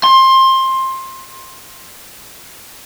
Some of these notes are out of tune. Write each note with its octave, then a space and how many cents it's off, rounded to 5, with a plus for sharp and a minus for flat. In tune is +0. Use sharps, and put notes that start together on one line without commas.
C6 +20